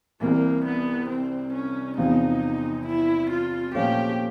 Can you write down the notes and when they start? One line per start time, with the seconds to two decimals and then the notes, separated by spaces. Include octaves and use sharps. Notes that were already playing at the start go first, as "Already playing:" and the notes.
0.21 C2 C3 E3 A#3
0.66 B3
1.09 C4
1.54 C#4
1.98 E2 C3 F3 D#4
2.86 E4
3.31 F4
3.75 A#2 F3 A3 C#4 G4